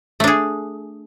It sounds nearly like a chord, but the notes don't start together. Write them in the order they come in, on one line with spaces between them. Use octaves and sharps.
A3 D4 G#4